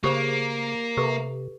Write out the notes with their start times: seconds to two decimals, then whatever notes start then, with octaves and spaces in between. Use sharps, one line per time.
0.04 C#3 A#3 G4 C5
0.97 C3 G4 A4 B4